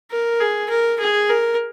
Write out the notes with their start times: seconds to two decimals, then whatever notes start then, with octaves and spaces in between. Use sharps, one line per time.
0.11 A#4
0.40 G#4
0.70 A#4
1.00 G#4
1.29 A#4